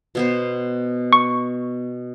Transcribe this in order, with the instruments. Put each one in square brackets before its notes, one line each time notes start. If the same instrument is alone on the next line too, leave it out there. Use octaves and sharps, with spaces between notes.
[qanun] B2 B3 C5
[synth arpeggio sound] C#6